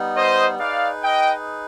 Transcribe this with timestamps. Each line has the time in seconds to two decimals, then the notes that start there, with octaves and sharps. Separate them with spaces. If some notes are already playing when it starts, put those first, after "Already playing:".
Already playing: G3 B3 D#4
0.15 C5 D#5
0.59 D#4 G#4 B4 D5 F5
1.03 D#5 G5